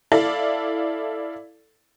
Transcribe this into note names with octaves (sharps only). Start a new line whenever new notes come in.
E4 A4 D5 F5